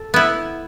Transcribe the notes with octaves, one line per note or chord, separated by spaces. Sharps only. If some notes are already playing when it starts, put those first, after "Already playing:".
Already playing: A4
B3 E4